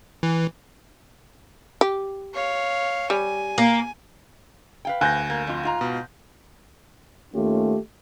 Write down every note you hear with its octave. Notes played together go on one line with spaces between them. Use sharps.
E3
G4
C#5 F5
G3 G#5
A#3
B4 F5 G5
D2 G#5 F#6 G6 A#6
A#3
F2 F4
G#2 F4 A#5
B2
D#2 A3 C#4 F4 G4